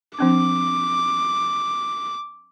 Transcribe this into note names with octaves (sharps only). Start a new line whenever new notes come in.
F3 C4 D4 D6